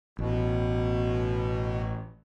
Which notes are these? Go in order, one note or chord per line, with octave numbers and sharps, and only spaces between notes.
A1 B2